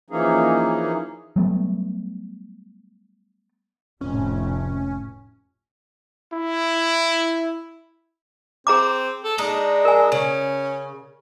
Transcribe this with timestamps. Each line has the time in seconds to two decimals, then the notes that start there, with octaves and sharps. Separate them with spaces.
0.10 E3 F3 A#3 C#4 D#4 G#4
1.36 F#3 G3 A3 B3
4.01 F1 A2 C#4
6.33 E4
8.67 C4 G#4 A#5 D6
9.24 A4
9.38 G#3 D4 D#4
9.85 A#4 G#5
10.12 C#3 C#4